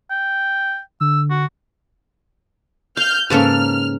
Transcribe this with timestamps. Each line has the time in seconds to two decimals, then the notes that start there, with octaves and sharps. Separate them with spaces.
0.10 G5
1.01 D3 E6
1.30 F#4
2.97 F5 F6 G6
3.30 G#2 C#3 A#3 C#4 A4 B4 F6